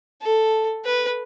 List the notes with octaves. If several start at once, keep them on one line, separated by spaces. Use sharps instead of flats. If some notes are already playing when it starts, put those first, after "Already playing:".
A4
B4